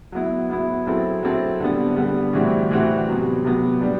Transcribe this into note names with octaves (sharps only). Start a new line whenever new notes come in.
F#3 B3 E4
F#3 B3 E4
F#3 C4 E4 A4
F#3 C4 E4 A4
D3 G3 B3
D3 G3 B3
A2 E3 G3 C4 F#4
A2 E3 G3 C4 F#4
C3 F#3 B3
C3 F#3 B3
G3 B3 D4